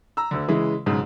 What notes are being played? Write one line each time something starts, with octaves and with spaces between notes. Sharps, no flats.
A#5 E6
D2 D3
C#3 E3 G#3
B1 G#2 C#3